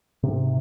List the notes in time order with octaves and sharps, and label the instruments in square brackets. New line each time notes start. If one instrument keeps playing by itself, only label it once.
[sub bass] G#2 [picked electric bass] C3